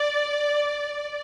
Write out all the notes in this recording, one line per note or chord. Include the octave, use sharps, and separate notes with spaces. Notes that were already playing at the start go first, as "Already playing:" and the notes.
Already playing: D5